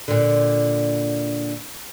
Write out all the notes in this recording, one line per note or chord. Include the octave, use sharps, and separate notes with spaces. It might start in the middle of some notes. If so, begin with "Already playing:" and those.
A#2 D3